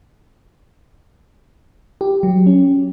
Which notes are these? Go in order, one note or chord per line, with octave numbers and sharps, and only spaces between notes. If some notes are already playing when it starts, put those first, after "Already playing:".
G4
F#3
C#4